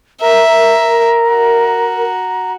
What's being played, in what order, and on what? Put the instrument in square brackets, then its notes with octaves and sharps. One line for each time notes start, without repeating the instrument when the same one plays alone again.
[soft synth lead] A#4 [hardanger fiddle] E5 [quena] A#5
[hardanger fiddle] F#4